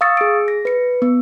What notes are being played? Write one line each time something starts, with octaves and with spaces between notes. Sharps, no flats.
F5 C#6 D#6 E6 A6 C#7
G#4 D7
A#6
B4 C#7
B3